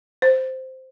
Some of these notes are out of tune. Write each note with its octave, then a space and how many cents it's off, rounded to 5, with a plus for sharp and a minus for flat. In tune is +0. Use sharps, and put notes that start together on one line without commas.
C5 -5